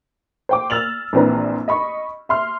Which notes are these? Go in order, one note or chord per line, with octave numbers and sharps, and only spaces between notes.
C5 G5 D6
E6 F6 A6 F7 F#7
A#1 E3 C4 D4 B4 A#5
D#5 B5 C#6
E5 C6 F6